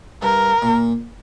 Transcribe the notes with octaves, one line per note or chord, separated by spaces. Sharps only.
G2 A#4
A#2